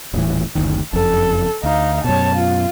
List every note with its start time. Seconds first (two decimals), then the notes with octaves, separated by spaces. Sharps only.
0.13 D#1 A2 E3
0.55 F#1 D2 D#3
0.93 F#1 F2 A4
1.63 D2 D#4 F5
2.04 F#2 B2 C#5 A5
2.36 F4